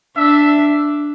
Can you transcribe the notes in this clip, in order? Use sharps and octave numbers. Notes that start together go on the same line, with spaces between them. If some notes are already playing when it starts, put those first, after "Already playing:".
D4 E5